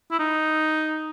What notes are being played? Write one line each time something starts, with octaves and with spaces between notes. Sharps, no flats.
E4
D#4